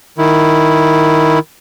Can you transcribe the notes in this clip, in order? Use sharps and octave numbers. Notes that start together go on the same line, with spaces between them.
D#3 E4